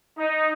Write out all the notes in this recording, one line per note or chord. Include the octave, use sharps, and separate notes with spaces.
D#4